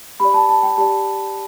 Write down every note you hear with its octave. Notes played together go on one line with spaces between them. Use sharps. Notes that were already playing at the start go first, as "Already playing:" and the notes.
G4 D5 B5
A5
A5
G5
G4 D5 A5